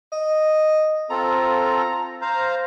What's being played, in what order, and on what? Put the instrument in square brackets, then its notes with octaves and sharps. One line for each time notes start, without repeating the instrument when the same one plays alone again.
[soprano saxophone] D#5
[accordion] C4 F4 A4 [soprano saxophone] A#5
[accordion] C5 F5 A#5